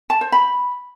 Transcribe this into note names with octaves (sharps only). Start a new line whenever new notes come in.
A5
C5
B5